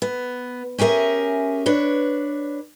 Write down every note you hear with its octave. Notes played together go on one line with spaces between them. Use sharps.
B3
C#4 G4 G#4 A#4 E5
D4 B4 C#5